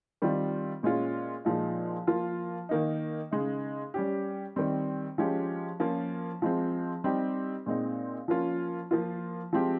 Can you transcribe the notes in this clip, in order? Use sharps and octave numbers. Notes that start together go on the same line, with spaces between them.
D#3 G3 C4 F4
A#2 G#3 C#4 F4
A#2 F3 G#3 D#4
F3 A#3 F4
D#3 A#3 D#4
C#3 G#3 D#4
G3 C#4 G4
D#3 G3 C4
F3 G#3 C#4 G4
F3 A#3 C#4 F4
F3 G#3 C4
G3 C4 D#4 G4
A#2 G#3 C4 D#4
F3 A#3 C#4 F4
F3 A#3 F4
F3 G#3 C4 G4